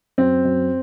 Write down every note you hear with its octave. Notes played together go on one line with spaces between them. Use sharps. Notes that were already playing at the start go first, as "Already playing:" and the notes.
F#2 C4
F#2